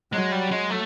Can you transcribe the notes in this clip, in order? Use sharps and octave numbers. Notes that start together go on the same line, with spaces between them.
F#3 G#3
G3
G#3
A3